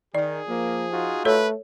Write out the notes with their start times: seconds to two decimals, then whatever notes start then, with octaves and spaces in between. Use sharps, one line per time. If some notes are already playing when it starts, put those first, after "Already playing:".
0.15 D#3 G#4 D5
0.48 F3 A#3
0.92 D#4 F4 F#4
1.25 A3 A4 B4 C#5 E6